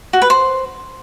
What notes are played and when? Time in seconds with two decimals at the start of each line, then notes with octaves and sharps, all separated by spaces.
0.13 F#4
0.22 B4
0.30 C5